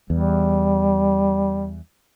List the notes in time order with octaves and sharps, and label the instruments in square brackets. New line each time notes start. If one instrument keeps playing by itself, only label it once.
[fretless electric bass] E2 [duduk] G3